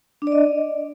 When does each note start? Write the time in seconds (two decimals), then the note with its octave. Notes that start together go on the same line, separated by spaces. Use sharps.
0.22 D4
0.27 D5
0.32 D#5